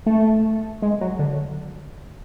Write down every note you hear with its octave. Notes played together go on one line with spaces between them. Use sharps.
A3
G#3
F#3
D3